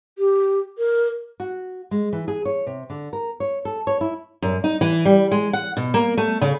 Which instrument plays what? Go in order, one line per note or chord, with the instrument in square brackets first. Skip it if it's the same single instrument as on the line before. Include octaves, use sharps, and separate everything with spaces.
[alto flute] G4
A#4
[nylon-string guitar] F#4
G#3
E3
G#4
C#5
C3
D3
A#4
C#5
A4
C#5
E4
[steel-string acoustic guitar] F#2
D#4
E3
G3
G#3
F#5
B2
A#3
A3
C#3